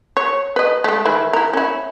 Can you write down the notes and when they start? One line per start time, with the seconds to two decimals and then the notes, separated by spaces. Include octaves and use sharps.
0.17 C#5
0.56 B4 D#5
0.84 G#3 A3
1.05 D#3 E3 E4
1.33 E4 A#4
1.53 C#4 E4